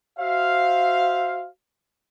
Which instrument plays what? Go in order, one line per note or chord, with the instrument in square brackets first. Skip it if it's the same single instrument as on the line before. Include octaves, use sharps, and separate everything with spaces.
[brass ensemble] F#4 C5 E5 F5